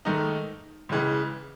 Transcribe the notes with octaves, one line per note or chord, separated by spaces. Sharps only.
G#2 D#3 A3 D#4
C#2 C#3 E3 G#3